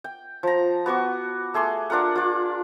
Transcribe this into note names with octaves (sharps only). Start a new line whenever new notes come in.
G5
F3 A#5
B3 F#4 C#6 D6
A3 G#4 C6 D6
D4 F4 A#4 F#5
F4 D5